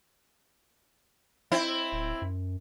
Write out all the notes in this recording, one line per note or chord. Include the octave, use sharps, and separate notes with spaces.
C4 E4
D1
F#2